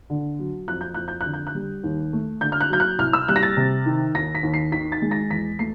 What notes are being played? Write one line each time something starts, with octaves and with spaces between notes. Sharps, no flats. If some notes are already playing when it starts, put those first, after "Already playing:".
D3
F#3
F2 F#6
G6
F2 F#6
G6
D3 F#6
G6
F#6
G3
D#2
A3
D3 G6
F6
F#6
F#3 G6
F#6
C2 F6
E6
G3 F#6
A#6
A6
C3
D#3
D#2 A#6
B6
D#2
C7
D#3 B6
A6
G#3
A#6
E2 B6
A3 C7